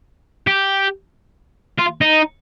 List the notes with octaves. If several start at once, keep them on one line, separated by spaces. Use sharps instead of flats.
G4
F4
D#4